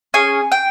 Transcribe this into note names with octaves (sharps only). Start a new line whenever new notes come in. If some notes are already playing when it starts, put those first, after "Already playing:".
C#4 G#4 G#5
G5